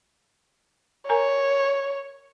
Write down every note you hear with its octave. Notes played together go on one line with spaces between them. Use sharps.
A#4 C#5 G#5 A#5